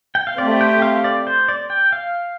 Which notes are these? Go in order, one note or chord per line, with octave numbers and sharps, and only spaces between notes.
G5
F5
A3 C4 G4 D5
G5
F5
D5
C5
D5
G5
F5